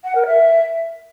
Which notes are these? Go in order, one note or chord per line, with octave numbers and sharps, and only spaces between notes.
F#5
A#4
E5